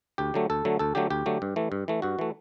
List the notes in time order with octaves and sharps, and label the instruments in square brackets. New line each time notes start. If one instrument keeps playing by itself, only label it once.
[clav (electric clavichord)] D2 G4
D3 F#3 A3
D2 A4
D3 F#3 A3
D2 A4
D3 F#3 A3 G4
D2 G4
D3 F#3 A3
G2
E3 A3
G2
E3 A3
G2 F#4
E3 A3